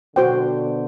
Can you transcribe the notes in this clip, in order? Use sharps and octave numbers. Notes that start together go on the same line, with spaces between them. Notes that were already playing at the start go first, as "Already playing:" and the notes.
B2 D3 F#4 C5 G5